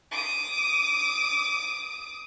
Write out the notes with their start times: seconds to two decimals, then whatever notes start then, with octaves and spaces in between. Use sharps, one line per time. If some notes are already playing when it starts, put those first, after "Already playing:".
0.11 D6 D#6